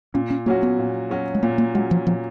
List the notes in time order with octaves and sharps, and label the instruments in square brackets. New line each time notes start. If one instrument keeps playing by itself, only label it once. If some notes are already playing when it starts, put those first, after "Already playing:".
[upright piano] A#2 [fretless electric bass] C#4
[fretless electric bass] C#4
[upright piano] F#3 C#4 F#4 [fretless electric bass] A#3
[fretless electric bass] B3
[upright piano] A#2
F#3 C#4 F#4
[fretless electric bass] G#3
[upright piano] A#2 [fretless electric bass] A#3
[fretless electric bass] A#3
[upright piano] F#3 C#4 F#4 [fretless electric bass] G#3
[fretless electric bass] F3
[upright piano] A#2 [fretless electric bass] F3